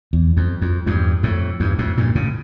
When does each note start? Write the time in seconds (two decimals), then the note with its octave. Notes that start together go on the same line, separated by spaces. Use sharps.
0.13 E2
0.37 F2
0.62 F2
0.86 E2 G2
1.23 F2 A2
1.60 E2 G2
1.79 F2 A2
1.98 G2 A#2
2.15 A2 C#3